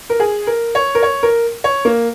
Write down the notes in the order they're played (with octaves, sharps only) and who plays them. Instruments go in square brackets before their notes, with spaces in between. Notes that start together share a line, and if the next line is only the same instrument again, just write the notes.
[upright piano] A#4
G#4
A#4
C#5
A#4
C#5
A#4
C#5
A#3